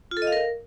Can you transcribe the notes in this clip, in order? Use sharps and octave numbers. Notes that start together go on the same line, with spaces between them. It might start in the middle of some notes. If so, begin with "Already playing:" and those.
F4
A4
D#5
F5
A#4